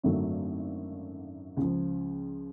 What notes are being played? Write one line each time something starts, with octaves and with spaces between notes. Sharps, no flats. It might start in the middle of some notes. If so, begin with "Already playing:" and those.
G#1 F#2 D3 F#3 A3
C#2 C#3 F3